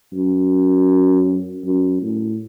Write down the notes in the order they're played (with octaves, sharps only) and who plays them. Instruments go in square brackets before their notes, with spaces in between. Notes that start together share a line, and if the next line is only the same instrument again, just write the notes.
[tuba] F#2
F#2
A2